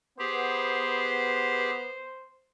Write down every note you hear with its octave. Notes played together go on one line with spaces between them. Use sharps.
B3 G4 G#4 C5